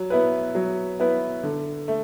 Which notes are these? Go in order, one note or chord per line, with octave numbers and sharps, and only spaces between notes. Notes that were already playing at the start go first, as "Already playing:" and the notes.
Already playing: F#3
B3 E4 B4
F#3
B3 E4 B4
D3
A3